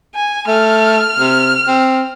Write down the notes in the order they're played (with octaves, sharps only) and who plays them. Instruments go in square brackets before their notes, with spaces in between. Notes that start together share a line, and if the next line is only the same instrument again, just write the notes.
[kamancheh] G#5
[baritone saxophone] A3 [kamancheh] F6
[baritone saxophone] C3
C4